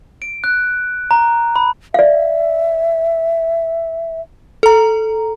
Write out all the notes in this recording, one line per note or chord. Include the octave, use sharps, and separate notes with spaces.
D7
F#6
A#5
B5
D5 E5 F5
A4 A#5